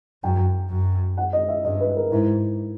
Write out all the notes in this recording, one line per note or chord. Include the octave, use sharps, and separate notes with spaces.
F#2 G5
F#2
F#5
D#5
E5
G2 D#5
B4
A#4
G#2 E4